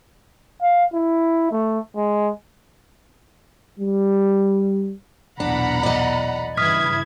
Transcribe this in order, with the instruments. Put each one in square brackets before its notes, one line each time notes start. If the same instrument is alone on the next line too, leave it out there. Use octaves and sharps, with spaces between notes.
[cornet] F5
E4
A3
G#3
[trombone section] G3
[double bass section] B1 E2 A#2 [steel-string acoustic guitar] D4 [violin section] F#5 A#5 B5
[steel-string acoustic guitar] D5 D#5
[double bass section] G2 C#3 E3 [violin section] E4 G#6 [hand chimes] D#6 F6 B6